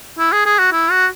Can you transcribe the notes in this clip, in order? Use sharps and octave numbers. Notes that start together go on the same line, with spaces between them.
E4
G#4
G#4
F#4
E4
F#4